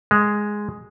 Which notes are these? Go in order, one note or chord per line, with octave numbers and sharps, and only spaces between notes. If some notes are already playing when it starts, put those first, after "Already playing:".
G#3